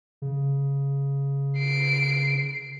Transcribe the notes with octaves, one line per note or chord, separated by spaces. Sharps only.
C#3
C7 D7